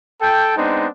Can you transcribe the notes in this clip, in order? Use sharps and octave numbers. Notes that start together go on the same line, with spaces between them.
A4 G5
G#3 B3 C4 D4 D#4